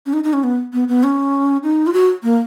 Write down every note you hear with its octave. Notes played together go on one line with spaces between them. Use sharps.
C#4
D#4
D#4
C#4
B3
B3
B3
C#4
D#4
F4
F#4
A#3